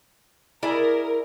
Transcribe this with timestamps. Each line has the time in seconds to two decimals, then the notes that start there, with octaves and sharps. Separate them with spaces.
0.63 E4 G#4 A#4 D5